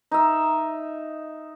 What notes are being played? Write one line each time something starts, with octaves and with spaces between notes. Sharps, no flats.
D#4 E5